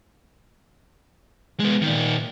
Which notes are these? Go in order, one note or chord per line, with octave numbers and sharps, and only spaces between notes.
G#3 B3
A#2 D#3